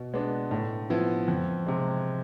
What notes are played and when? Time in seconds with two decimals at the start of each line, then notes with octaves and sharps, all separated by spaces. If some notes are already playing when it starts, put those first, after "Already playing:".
Already playing: B2
0.14 G#3 B3 D4
0.51 A2
0.90 F3 B3 E4
1.28 F2
1.67 C3 G#3